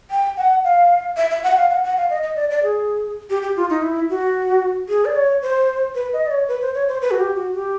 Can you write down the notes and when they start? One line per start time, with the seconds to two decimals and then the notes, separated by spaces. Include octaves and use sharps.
0.11 G5
0.37 F#5
0.64 F5
1.17 E5
1.31 E5
1.43 F#5
1.57 F5
1.71 F#5
1.84 F#5
1.97 F5
2.10 D#5
2.23 D#5
2.36 D5
2.50 D5
2.63 G#4
3.30 G4
3.42 G4
3.56 F4
3.70 D#4
3.82 E4
4.10 F#4
4.89 G#4
5.05 D5
5.16 C#5
5.42 C5
5.95 B4
6.13 D#5
6.27 D5
6.31 C#5
6.48 B4
6.61 C5
6.74 C#5
6.88 C5
7.02 B4
7.11 F#4
7.20 G4
7.36 F#4
7.55 G4